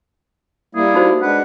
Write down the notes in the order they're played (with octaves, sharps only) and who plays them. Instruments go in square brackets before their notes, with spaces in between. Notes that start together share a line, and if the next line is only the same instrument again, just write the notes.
[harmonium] G3 A#3 E4 [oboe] G#4
[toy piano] D#4 F#4 C5
[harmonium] G#3 D4 F#5 [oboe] B4